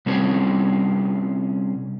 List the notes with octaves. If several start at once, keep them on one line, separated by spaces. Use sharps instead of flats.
C3 G3 C4 C#4 G#4 C5